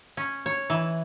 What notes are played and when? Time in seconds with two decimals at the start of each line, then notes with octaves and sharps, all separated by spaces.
0.17 C#4
0.46 C#5
0.70 E3